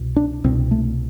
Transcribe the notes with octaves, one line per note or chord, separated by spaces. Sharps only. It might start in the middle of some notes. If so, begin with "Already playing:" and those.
Already playing: C2 B2
D4
C2 B2 C4
A3